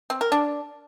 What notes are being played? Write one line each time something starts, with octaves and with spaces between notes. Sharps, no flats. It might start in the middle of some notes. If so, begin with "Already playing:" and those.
C4
A#4
D4